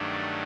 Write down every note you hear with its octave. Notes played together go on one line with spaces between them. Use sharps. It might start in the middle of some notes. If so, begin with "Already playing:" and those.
Already playing: G2 D#3 F#3 A3 D4